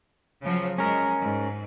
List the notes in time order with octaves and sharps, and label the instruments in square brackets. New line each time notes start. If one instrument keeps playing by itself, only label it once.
[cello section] C#3 F3 F#3
[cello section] G#3 [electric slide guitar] C#4 A#4
[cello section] G#2